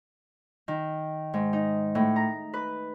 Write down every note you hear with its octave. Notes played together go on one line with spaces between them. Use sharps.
D#3
G#2
D#4
A2
A#5
B4